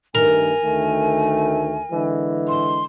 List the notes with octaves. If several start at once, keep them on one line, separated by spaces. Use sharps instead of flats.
G2 D#3 A3 A#4 G#5
D2 D#3 A3
D3 E3 G#3
C6